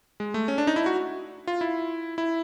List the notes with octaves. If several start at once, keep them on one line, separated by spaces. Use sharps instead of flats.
G#3
A3
C#4
D4
D#4
E4
F#4
F4
E4
E4